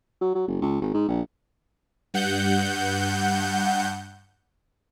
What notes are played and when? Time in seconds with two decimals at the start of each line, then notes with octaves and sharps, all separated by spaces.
0.21 F#3
0.35 F#3
0.47 F#1
0.62 C#2
0.82 G#1
0.94 G#2
1.08 A#1
2.14 G2 F#5 G6